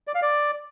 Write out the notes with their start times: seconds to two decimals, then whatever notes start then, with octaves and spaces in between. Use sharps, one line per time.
0.07 D5
0.15 F5
0.22 D5